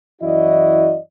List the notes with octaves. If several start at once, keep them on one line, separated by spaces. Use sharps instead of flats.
F#2 E3 E4 F#4 D5 D#5